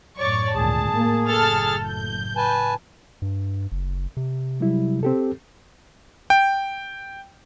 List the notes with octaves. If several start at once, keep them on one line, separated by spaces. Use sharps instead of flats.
F#2 A2 C#5 D5 C#6
G#1 D2 A#2 G#4 A5
A2 A#3
F#1 A2 A4 F6 A6
G6
B4 G#5 A5
G2
F#1
C3
F#3 G3 E4
C4 G4 A4
G5